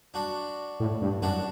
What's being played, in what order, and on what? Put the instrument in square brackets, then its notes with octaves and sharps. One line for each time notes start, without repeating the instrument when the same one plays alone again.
[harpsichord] D4 F#4
[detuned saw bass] A2
G2
[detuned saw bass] F#2 [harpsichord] D4 F#4